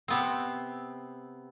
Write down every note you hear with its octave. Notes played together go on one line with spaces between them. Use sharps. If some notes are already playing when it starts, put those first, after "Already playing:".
C3 B3 C4